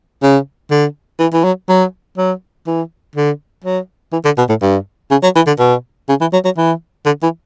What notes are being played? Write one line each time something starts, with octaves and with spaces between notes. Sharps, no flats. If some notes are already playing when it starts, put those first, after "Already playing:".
C#3
D3
E3
E3
F#3
F#3
F#3
E3
D3
F#3
E3
D3
B2
A2
G2
C#3
F#3
E3
D3
B2
C#3
E3
F#3
F#3
E3
D3
E3